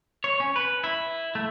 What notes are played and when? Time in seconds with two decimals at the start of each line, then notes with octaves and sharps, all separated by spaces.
0.24 C#5
0.40 C#4
0.56 B4
0.84 E4
1.35 A3